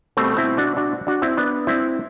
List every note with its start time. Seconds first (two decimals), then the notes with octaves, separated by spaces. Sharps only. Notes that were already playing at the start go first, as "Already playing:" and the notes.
0.17 B2 G3 A3 C4
0.37 C4 E4
0.57 D4 F#4
0.77 D4 F#4
1.07 D4 F#4
1.22 C4 E4
1.37 B3 D4
1.67 C4 E4